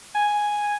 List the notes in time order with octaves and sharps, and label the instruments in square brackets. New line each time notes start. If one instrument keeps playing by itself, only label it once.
[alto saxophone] G#5